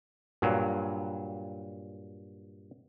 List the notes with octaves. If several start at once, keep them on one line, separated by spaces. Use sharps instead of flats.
G2 A#2 F#3